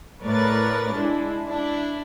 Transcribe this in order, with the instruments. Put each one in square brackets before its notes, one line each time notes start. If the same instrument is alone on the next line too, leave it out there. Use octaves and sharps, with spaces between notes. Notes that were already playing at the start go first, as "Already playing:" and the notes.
[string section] A2 A#4 B4 C#5 D5 A6
G#3 D4 E4
D4 E4